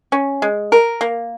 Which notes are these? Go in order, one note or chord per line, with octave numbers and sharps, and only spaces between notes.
C#4
G#3
A#4
A#3